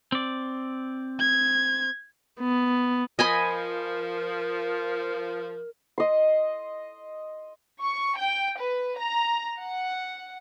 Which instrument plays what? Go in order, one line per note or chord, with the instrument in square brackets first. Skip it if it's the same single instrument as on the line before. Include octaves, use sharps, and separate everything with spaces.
[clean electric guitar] C4 D5
[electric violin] G#6
[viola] B3
[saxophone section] F3 [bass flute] A#4 [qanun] D#5 G#5 B5
[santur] D#5 C6
[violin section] C#6
G5
B4
A#5
F#5